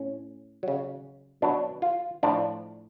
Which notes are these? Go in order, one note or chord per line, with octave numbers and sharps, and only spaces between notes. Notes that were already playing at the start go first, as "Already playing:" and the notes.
Already playing: A2 C#4
C#3 F#3
B2 F#3 D4
F4
A2 F3 D4